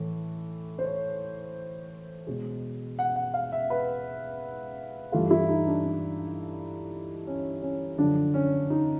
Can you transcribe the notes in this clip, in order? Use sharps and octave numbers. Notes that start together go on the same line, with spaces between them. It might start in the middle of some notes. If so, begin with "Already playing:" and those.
Already playing: A2 E3 A3
C5
C#5
B2 G#3
F#5
F#5
F5
E5
B4
G2 E3 A3 F4
E4
D#4
D4
D4
C#4
C#4
F#2 D3 F3 D4
C#4
D#4